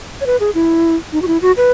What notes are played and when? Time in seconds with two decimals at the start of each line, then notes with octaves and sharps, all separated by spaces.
0.21 C#5
0.26 B4
0.40 G#4
0.55 E4
1.13 D#4
1.22 F#4
1.27 E4
1.42 F#4
1.57 B4